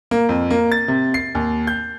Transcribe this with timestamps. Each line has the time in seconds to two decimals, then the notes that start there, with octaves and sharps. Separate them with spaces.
0.11 A#3
0.29 F2
0.51 A#3
0.72 A6
0.88 C3
1.14 C7
1.35 D#2
1.67 G6